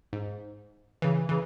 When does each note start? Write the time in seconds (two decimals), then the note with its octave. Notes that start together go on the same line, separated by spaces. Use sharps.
0.13 G#2
1.02 C#3 E3
1.29 C#3 E3